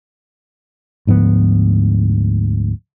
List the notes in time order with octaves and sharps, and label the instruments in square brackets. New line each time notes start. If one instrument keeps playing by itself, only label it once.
[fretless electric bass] D2 G#2 F3 B3